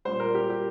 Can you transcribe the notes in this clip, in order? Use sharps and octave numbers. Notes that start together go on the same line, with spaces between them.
A#2 G3 C5
A#4
G4
G4